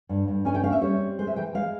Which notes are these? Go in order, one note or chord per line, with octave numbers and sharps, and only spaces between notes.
G2
G2
C#4 G#5
G5
C#4 F5
E5
G3 C#5
C4
G#3 C5
E5
E3 G5
G#3 F5